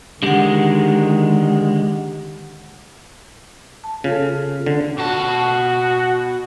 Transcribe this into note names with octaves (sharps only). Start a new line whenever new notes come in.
D3 D#3 G#3 G4 F#5
A5
C#3 F4 A4
D3
B2 F#4 A5